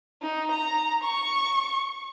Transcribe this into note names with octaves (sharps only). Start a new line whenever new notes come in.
D#4
A#5
C#6